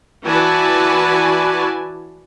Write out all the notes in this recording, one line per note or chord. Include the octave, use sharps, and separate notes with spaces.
E3 F#4 B4 D5 G#5 A5